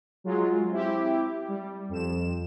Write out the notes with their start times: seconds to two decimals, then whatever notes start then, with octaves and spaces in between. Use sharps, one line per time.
0.24 F#3 G#3 F4
0.70 C4 E4 G4
1.48 G3
1.89 F2 E7